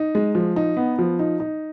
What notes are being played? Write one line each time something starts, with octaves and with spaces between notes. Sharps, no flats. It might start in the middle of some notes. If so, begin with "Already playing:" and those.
Already playing: D#4
G#3
F3
D#4
B3
F3
D#4
D#4